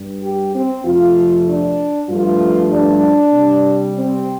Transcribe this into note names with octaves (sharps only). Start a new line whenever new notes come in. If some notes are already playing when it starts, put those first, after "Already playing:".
Already playing: G2 G3
G4
C4
F2 C3 F3 A3 F4
D4
G2 F3 A3 F4
D4
C3 G3
C4